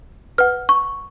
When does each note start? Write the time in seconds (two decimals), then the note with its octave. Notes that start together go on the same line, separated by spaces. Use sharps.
0.38 B4 F#5 F6
0.69 C#6